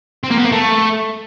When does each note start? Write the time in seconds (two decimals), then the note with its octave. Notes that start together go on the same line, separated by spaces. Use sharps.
0.24 C4
0.31 A#3
0.38 B3
0.45 A#3
0.52 A3